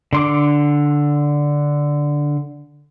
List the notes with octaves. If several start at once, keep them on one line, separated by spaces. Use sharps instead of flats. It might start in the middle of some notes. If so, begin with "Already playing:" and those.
D3 C6 D6